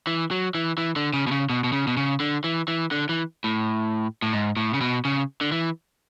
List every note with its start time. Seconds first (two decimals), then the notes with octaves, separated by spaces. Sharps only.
0.07 E3
0.31 F#3
0.55 E3
0.78 E3
0.96 D3
1.13 C#3
1.27 B2
1.31 C#3
1.50 B2
1.64 B2
1.72 C#3
1.87 B2
1.97 C#3
2.20 D3
2.44 E3
2.68 E3
2.91 D3
3.09 E3
3.44 A2
4.22 A2
4.33 G#2
4.57 A2
4.74 C#3
4.81 B2
5.05 C#3
5.41 D3
5.52 E3